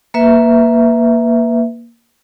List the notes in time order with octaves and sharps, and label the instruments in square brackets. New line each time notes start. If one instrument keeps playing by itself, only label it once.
[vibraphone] A#3 B4 E5